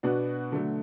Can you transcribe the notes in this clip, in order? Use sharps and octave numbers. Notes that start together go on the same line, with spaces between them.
B2 B3 D4 F#4
D3 F#3 A3